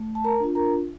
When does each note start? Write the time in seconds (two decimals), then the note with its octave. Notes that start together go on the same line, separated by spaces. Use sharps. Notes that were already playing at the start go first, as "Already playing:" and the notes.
Already playing: A3
0.15 A5
0.24 A#4 A#5
0.40 D4 F4
0.55 A#4 A#5